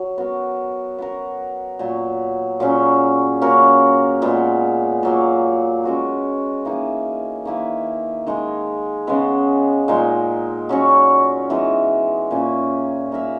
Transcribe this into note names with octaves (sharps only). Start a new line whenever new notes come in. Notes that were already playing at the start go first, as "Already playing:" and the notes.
Already playing: F#3
B3 F#4 A#4
B3 F#4 A#4
A#2 F#3 B3
A#2 F#3 C#4 G#4
A#3 C#4 F#4 A#4
A#2 G#3 B3
A#2 F#3 A#3
G#3 C#4 F#4 B4
E3 A#3 D#4 G#4
D#3 A#3 E4 B4
D#3 G#3 D#4 G#4
C#3 G#3 B3
A#2 G#3 D#4
F#3 C#4 F#4 C#5
E3 G#3 B3 D#4
A#2 A#3 C#4 G#4
A#3 D#4 A#4 E5